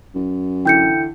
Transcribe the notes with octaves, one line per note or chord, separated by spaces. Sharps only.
F#2
D3 E3 E4 G5 G6 C#7